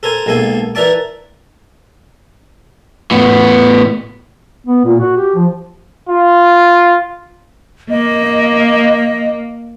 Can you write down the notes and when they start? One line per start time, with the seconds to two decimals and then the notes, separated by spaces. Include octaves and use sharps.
0.03 A4 A#4 C5 G#5
0.26 B1 G#3 A#3 A4 G#5
0.75 E3 A#4 D5 E5 A5 D6
3.11 A2 B3
4.67 B3
4.85 A#2
5.00 F#4
5.16 G4
5.35 F3
6.09 F4
7.90 A#3 D#5